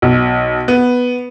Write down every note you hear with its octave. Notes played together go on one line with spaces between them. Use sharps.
B1
B3